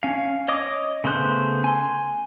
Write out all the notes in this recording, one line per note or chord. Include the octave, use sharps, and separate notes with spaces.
C#4 F5
C#5 D#5 D6 D#6
C#3 A3 B3 C5 F#6
G#5 C6